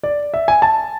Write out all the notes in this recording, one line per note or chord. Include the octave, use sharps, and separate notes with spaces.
D5
E5
G#5
A5